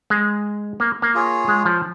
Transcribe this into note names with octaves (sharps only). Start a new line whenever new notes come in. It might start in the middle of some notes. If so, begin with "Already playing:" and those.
G#3
A#3
A#3
F4 G#4 C#5
G#3
F3